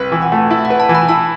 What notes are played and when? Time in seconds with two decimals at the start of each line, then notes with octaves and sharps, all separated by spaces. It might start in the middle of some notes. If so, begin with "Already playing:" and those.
Already playing: C2 B4
0.12 E3
0.22 F#5
0.32 A3
0.51 E4 E5
0.65 F#5
0.70 B4
0.80 A5
0.89 E3
0.95 B5
1.09 E4 A5